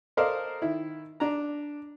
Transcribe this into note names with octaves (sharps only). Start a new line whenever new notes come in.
A4 A#4 C5 D5 D#5 F5
D#3 E4
D4 A#5